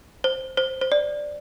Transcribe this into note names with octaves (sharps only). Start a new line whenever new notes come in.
C5
C5
C5
D5